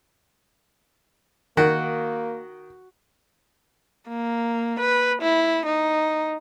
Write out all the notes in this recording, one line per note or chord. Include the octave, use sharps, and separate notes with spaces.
D#3 A#3 F#4
A#3
B4
E4
D#4